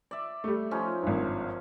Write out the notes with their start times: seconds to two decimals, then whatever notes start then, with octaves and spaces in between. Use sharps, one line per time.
0.11 D5 E5
0.44 G3 A3
0.71 F3 C#4 D#4
1.03 G#1 G2